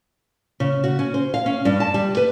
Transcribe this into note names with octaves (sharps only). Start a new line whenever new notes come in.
C#3
F#4
C#4
C5
F5
C#4
G2
A5
G3
B4